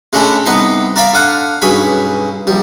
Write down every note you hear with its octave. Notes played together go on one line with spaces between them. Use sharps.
G#3 A3 C#4 D4 E4
C2 B3 D#4 C6
A#4 D5 E5 F5 B5
D3 F5 F#5
B1 G2 C#4 G#4 B5
A#1 G3